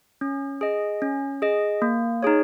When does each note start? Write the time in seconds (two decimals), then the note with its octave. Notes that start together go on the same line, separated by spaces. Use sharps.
0.21 C#4
0.61 G#4 D#5
1.02 C#4
1.42 G#4 D#5
1.82 A#3
2.23 D#4 G#4 C#5